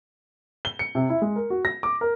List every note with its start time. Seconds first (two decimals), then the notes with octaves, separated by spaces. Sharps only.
0.65 G7
0.79 C#7
0.95 C3
1.10 E4
1.22 G#3
1.36 A#4
1.50 F#4
1.65 A#6
1.83 D6
2.01 A#4